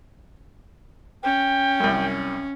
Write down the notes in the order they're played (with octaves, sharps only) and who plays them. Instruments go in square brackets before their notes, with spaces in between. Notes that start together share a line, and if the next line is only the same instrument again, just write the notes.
[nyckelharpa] C#4 [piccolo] G5
[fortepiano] C2 F#2